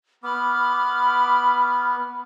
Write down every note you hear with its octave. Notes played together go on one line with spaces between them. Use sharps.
B3 B5 D6 F6